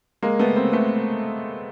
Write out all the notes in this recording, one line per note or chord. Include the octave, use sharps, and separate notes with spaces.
G#3 A#3
A3 B3
A#3 C4
A3 B3